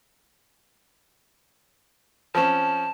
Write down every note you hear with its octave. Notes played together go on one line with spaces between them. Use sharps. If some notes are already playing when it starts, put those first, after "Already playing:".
F3 C4 C#4 A5